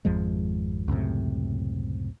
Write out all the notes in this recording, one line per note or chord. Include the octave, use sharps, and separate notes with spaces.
G#1 F2 F3 G#3
C#2 F#2 A2 C3